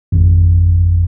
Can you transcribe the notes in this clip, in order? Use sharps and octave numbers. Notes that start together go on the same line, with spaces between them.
G#1 F2